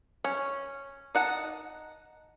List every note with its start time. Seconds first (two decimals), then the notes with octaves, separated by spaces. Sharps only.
0.24 C#4
1.15 D#4 F#5 A5